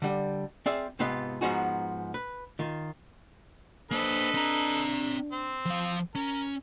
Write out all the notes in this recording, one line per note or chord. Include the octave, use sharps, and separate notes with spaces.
D3 G3
C4 F4 G#4 D5 E5
G#2 C3 B3 F4 B4 D#5
G#2 F3 B3 D#4 F#4 G#4
B4
D#3 F4
A#3 D4 A4 B4 C5 D#5
C4 A#5
C4
F3 F5
C#4 A#4